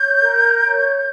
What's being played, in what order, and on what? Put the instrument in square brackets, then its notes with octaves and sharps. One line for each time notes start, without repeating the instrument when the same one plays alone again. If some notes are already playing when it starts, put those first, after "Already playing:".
Already playing: [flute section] C#5 G6
A#4
C#5